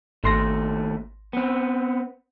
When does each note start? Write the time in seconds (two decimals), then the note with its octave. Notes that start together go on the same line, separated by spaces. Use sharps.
0.24 G#1 D#2 A3 C6 A#6
1.33 B3 C4